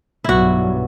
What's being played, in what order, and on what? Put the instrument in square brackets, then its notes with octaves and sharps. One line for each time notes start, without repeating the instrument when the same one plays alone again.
[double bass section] B1 G2 F#3 [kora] E4 F#4